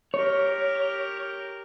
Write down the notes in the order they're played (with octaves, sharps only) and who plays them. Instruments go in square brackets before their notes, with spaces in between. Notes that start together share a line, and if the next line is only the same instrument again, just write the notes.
[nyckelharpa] G4 A#4 [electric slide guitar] C#5